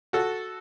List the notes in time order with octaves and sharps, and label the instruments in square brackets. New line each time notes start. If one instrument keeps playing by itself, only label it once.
[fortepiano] F#4 A4